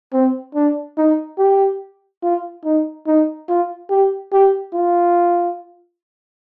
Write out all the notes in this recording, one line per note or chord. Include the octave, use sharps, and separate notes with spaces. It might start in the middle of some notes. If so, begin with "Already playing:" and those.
C4
D4
D#4
G4
F4
D#4
D#4
F4
G4
G4
F4